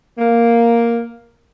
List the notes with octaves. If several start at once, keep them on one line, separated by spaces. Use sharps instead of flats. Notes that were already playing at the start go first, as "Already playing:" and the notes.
A#3